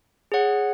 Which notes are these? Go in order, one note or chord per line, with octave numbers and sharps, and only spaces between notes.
G#4 C#5 F#5